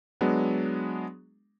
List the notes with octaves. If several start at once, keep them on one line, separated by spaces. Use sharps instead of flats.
F#3 G#3 B3 D4